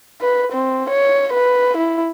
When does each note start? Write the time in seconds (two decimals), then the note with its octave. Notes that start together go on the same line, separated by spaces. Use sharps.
0.21 B4
0.52 C4
0.90 C#5
1.33 B4
1.77 E4